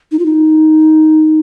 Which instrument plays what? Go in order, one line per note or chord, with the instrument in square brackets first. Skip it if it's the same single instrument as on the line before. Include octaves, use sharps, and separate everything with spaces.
[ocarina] D#4
F4
D#4